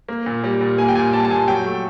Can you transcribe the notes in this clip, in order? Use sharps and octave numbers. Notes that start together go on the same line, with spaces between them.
A#3
A#2
G3
A#2
A#3 G#5
G5
A#2 G#5
G3 A5
A5
A#2 G#5
F#3 G5
A3